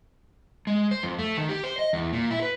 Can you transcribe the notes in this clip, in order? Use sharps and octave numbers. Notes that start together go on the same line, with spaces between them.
G#3
C5
F2
A3
D#3
G4
C5
D#5
E2
A#2
E4
B4